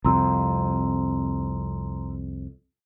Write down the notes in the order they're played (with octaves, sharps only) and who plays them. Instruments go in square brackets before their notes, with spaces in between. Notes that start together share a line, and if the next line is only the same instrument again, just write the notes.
[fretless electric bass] C2 F2 [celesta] A#5 C6 E6